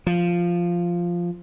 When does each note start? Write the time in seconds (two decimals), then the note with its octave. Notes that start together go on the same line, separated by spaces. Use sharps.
0.07 F3